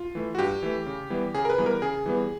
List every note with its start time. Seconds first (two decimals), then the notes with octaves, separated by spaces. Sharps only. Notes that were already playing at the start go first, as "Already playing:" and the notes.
Already playing: F4
0.15 E3 A3
0.35 F#4
0.39 G2 G4
0.63 E3 A3
0.86 C#3
1.10 E3 G3 B3
1.34 C#3 G#4
1.45 A#4
1.50 B4
1.58 E3 G3 B3
1.66 A#4
1.82 C#3 G#4
2.06 E3 G3 B3